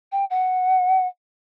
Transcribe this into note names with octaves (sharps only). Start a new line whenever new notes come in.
G5
F#5